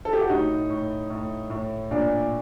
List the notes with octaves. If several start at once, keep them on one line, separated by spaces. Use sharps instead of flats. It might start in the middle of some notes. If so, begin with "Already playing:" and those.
A4
G4
F#4
A2 D#4
A2
A2
A2
A#2 D4